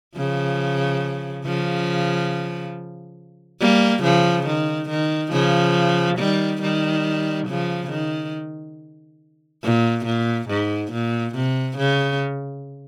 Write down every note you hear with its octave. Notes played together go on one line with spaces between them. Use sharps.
C#3 F3
C#3 F3
G3 A#3
C#3 F3
D#3
D#3
C#3 F3
D#3 G3
D#3 G3
C#3 F3
D#3
A#2
A#2
G#2
A#2
C3
C#3